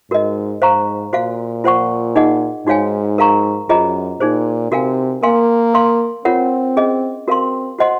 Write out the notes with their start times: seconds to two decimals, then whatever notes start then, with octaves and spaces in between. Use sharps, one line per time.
0.11 G#2 F#4 A#4 D#5
0.62 G#2 C5 F5 A#5 C#6
1.13 A#2 F#4 C5 F5
1.64 F4 C5 F#5 C#6
2.16 D#4 G#4 D#5 F#5
2.66 G#2 D#4 F#4 C#5 F5 G#5
3.18 F#4 A#4 F5 A#5 C#6
3.69 F#2 F4 G#4 C5 D#5 A#5
4.20 A#2 D#4 G#4 C5
4.71 C3 F#4 A#4 F5 G#5
5.23 A#3 A#4 F5 G#5 C6
5.74 A#4 F5 C6
6.25 C4 F4 A#4 C#5 F#5
6.76 C#4 G#4 D#5
7.28 C4 F#4 A#4 F5 C6
7.79 F#4 C5 D#5 F#5 C6